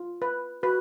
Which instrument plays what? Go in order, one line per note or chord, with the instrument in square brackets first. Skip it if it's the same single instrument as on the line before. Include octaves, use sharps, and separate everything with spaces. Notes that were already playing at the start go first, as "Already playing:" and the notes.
Already playing: [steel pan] F4
B4
[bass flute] F#4 [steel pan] B4